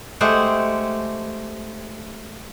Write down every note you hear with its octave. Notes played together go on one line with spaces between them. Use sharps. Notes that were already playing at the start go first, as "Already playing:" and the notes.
G#3 A3 G4 C5 F#5